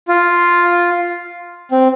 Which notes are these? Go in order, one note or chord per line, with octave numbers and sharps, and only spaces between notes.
F4
C4